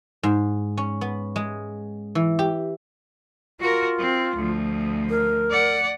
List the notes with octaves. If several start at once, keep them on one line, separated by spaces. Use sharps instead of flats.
G#2
C#4
B3
G#3
E3
G4
F4 F#4 A#4
C4
D2 F3
A#4
D5 F#5